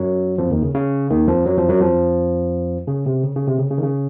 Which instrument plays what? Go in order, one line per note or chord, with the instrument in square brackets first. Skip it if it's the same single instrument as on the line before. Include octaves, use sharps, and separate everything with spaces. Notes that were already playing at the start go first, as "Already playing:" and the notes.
Already playing: [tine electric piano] F#2 F#3
F2 F3
D#2 D#3
C#3
C#3
D#2 D#3
F2 F3
F#2 F#3
F2 F3
F#2 F#3
F2 F3
C#3
C3
C#3
C#3
C3
C#3
C#3
D#3
C#3